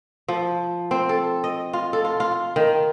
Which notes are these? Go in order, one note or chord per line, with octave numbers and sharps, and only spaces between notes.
F3
C4
A4
D#5
F4
A4
F4
F4
D#3